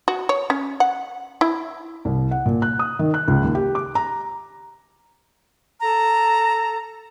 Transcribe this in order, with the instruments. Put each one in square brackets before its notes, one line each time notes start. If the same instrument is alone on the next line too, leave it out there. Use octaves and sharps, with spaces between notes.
[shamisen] F#4
C#5
C#4
F#5
E4
[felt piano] C2
F#5
A#2
F#6
D#6
D#3
F#6
C#2
D#2
G4
D6
A#5
[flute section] A4 A#5